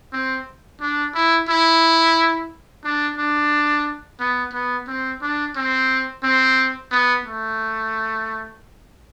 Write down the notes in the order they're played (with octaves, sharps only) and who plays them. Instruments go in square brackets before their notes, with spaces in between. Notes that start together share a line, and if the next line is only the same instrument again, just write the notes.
[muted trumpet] C4
D4
E4
E4
D4
D4
B3
B3
C4
D4
C4
C4
B3
A3